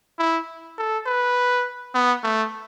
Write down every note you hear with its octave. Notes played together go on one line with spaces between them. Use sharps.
E4
A4
B4
B3
A3